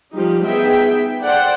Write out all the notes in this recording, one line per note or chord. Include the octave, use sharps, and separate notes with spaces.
F3 G3 D#4 G4
B3 D#4 G#4 E5 G5
A4 C5 D5 F#5 G5